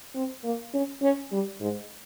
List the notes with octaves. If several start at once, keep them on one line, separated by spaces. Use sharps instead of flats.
C4
A#3
C#4
C#4
G3
G#2